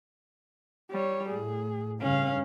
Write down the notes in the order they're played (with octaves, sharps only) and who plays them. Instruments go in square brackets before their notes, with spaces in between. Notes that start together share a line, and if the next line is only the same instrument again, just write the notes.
[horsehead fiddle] G3 C#5
[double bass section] A2 [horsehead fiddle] G#4
[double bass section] G2 C#3 [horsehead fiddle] C#4 F5